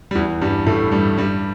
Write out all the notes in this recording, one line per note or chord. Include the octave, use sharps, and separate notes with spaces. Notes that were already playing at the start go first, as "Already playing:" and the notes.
G3
E2 E3
G2 G3
A2 A3
G2 G3
G2 G3